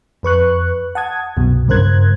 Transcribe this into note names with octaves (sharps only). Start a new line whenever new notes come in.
F2 B4 C#6 F#6
F#5 A5 D#6 G#6
C2 F#2 B2
G2 C#3 A#4 C5 F#6 G#6